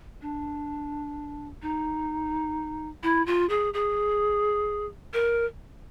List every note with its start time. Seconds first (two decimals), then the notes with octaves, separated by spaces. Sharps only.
0.21 D4
1.62 D#4
3.03 E4
3.26 F4
3.49 G#4
3.74 G#4
5.13 A#4